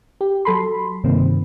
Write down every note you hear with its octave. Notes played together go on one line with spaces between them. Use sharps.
G4
F#3 A4 B5 C6
G2 C3 D#3 A#3 C4